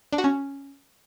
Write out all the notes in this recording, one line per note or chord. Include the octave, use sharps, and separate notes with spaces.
D4
F#4
C#4